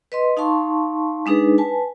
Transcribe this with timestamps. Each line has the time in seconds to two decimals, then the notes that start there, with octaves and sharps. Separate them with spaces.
0.12 B4 D#5 C6
0.37 D#4 F5 A5 C6 C#6
1.26 G#3 D4 D#4 G#4 B4
1.58 B4 G#5 A5